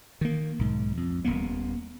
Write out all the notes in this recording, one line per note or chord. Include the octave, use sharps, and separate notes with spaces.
D#3 A#3
B1 G#2
F2
D#1 E2 A#3 B3